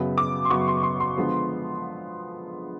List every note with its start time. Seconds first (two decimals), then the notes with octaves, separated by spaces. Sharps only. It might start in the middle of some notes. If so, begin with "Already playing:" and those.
Already playing: F#2 C#3 F#3 B3
0.18 D6
0.45 C6
0.50 F#2 C#3 F#3 B3 C#6
0.68 C6
0.83 C6
1.00 C6
1.17 D3 F3 G#3 B3